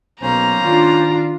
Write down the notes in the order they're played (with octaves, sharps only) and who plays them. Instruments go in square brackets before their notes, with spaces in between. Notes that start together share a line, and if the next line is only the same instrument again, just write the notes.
[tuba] B1 [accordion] A#3 C#4 C5 [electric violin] A#5
[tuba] D#3 [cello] D4 F4